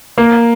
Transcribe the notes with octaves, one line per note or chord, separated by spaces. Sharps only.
A#3